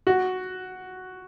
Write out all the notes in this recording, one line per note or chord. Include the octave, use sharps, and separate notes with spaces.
F#4